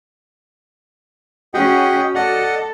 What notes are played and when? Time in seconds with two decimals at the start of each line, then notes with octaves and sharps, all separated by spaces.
1.54 C#4 F#4 G#4 D#5 F#5 G5
2.15 A4 D5 D#5 F#5